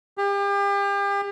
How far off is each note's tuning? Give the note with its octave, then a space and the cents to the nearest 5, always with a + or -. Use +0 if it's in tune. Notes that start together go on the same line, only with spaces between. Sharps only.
G4 +35